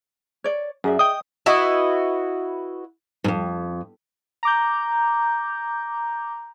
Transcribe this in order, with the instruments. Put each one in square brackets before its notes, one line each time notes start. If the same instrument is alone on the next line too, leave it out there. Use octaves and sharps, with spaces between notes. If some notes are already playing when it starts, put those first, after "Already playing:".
[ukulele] C#5 D5
[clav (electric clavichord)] F#2 [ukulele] G#4 D5 E5
[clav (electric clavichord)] D#5 G5 [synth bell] D#6
[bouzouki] E4 F#4 B4 D#5
[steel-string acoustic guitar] F2 G#2
[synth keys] A#5 D6 G6